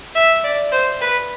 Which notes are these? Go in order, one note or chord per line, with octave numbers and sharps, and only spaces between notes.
E5
D5
C5
B4